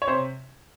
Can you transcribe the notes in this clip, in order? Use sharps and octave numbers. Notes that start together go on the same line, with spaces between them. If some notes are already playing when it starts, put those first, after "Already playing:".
C#5
C3 C5